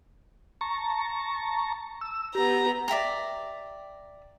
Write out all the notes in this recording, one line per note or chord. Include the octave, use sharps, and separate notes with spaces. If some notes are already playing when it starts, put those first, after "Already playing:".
A5 A#5 C#6
E6
B3 G4 A#5
D5 E5 G5 A#5